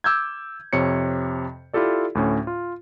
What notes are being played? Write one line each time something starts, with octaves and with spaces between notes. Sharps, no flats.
D6 E6 G6 G#6
F2 C3 C#5 C#7
E4 F4 G4 A4 D5
D2 A2 C#4
F4